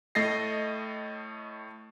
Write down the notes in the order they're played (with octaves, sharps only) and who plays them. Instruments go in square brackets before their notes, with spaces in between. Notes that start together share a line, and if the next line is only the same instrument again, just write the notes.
[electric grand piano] A2 A3 D#5 A6 A#6 C7